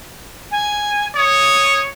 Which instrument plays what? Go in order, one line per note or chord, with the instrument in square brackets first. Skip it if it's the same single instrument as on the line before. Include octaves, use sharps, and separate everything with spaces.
[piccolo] G#5
[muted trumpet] C#5 [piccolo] D#6